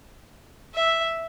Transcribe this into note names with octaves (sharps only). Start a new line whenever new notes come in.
E5